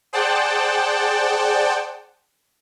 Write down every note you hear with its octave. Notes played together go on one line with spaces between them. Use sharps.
G#4 C5 D5 F#5 G5 A5